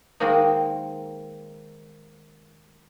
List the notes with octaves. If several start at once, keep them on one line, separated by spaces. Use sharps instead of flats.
D#3 G#3 A#3 C4 D#4